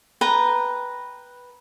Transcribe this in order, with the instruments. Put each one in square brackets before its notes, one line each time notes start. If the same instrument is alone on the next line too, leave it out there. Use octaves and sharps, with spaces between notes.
[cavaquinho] B4 G5 A#5